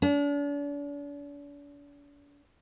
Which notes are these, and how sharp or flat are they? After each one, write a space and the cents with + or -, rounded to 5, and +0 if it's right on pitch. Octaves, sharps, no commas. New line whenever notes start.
D4 -40